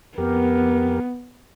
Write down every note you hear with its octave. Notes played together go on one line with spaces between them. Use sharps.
F2 B3 G4 A#4